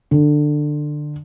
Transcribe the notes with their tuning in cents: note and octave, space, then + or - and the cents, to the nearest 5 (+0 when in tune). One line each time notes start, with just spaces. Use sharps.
D3 +20